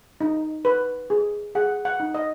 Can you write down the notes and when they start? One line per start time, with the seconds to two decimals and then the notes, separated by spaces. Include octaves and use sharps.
0.21 D#4
0.65 B4
1.10 G#4
1.55 G#4 F#5
1.85 F#5
2.00 D#4
2.14 D#5